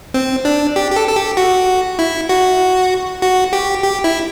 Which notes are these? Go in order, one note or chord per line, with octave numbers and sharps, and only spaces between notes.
C4
D4
G4
G4
A4
A4
G4
F#4
E4
F#4
F#4
G4
G4
E4